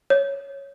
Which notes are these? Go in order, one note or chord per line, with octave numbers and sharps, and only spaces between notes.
C#5